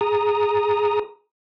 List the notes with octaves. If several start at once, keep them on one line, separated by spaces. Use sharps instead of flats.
G#4 A#5 D#6